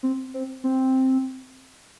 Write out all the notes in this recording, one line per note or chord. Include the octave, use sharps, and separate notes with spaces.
C4
C4
C4